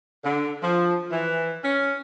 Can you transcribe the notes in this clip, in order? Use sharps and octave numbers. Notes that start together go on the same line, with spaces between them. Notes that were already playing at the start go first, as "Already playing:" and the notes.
D3
F3
E3
C#4